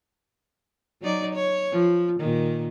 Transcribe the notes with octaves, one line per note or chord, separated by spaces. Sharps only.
F#3 D#4 D5
C#5
F3
A#2 D#3